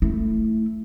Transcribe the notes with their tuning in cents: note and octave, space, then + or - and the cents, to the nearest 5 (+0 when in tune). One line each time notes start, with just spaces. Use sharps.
A3 +5 E4 +0